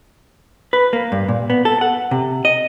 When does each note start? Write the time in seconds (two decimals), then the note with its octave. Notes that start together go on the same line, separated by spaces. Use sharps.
0.73 B4
0.93 A#3
1.12 G2
1.28 A#2
1.50 B3
1.65 A4
1.81 F#5
2.11 C3
2.45 D#5